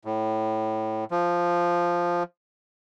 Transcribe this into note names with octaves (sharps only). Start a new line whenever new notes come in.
A2
F3